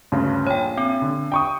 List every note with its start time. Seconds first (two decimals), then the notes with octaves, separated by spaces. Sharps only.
0.12 D2 G2 C#3
0.47 A#1 C#5 G5
0.77 C4
1.02 D3
1.32 G5 C#6 D#6